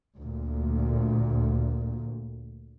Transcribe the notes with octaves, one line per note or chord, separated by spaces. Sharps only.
D2 A#2